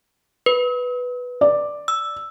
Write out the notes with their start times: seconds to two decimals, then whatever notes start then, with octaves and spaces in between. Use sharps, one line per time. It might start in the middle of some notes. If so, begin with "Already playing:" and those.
0.46 B4
1.41 D5
1.88 E6